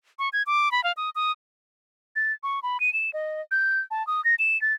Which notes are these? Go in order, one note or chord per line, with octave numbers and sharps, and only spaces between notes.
C#6
G#6
D6
B5
F5
D#6
D#6
A6
C#6
B5
D#7
E7
D#5
G6
A5
D#6
A#6
E7
A6